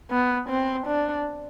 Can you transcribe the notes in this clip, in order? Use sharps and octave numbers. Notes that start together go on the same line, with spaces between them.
B3
C4
D4